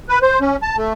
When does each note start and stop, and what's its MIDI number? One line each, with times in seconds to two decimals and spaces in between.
0.09 0.19 71
0.22 0.39 72
0.41 0.56 61
0.62 0.76 81
0.78 0.93 57